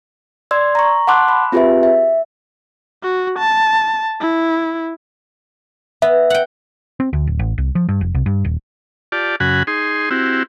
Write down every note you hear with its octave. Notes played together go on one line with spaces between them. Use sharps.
D5 C6 E6 G#6
A#5 C#6
F#5 A5 C6 D6 E6 F#6
B5
C4 F4 G4 G#4 B4 E5
E5
F#4
A5
E4
B3 E5
F#5 G5
C4
D2
D1
A1
C2
F3
G2
F1
C2
G2
D#1
F4 G4 D5 A5
F#2 C#3 F#4 F#5 G#5 B5
D#4 G#4 C6
C4 E4 F#4 G4